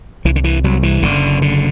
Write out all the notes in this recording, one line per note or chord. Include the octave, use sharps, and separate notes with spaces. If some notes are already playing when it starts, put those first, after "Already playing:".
C2 E3
D3
E3
C2 F#3
E3
F#1 D3
D3